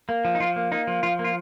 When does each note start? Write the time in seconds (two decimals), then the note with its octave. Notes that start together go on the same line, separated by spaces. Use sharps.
0.09 A#3
0.25 F3
0.35 D#4
0.40 F3 F4
0.56 A#3
0.72 A#3 D#4
0.87 F3
1.03 F3 F4
1.19 A#3
1.24 F4